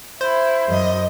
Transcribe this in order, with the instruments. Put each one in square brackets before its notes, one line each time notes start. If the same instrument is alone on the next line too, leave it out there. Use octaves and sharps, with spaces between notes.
[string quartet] E4 [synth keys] C5
[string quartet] F#2 D#5